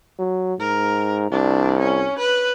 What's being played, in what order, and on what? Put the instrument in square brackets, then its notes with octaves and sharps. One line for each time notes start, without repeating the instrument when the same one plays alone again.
[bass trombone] F#3
[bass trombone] G#2 [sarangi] A#4
[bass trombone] C2 [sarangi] D4
[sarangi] C#4
B4